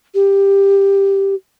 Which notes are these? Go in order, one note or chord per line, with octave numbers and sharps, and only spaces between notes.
G4